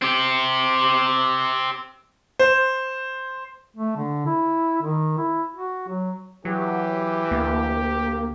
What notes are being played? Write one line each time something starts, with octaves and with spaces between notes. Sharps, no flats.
C4 G4
C5
A3
D3
E4
D#3
E4
F#4
F#3
E3 F#3 G4
D2 A#3